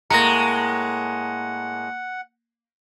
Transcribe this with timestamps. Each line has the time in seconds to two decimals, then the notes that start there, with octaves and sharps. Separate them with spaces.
0.10 A2 G#3 A#3 F#5 A#5 A#6 C#7